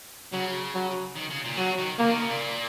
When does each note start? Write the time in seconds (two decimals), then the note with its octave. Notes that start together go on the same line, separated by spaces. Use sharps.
0.33 C#3 F#3
0.74 F#3
1.15 D#3
1.30 C#3
1.44 A#2
1.57 C#3 F#3
1.78 D#3
1.98 C#3 A#3
2.09 D#3
2.19 C#3
2.30 A#2